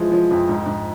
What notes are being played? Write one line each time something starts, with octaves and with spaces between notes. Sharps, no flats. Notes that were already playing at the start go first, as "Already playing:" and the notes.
Already playing: E3 F3 G#3
F3
F2
G#2
G#2